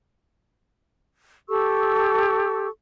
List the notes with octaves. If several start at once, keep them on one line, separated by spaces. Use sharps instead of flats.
G4 A4 C#6 E6